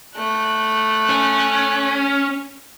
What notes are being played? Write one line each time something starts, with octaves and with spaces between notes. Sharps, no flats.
A3 F#6
C#4